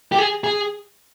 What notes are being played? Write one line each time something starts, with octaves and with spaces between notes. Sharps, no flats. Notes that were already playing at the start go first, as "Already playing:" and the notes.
G4
G#4
G#4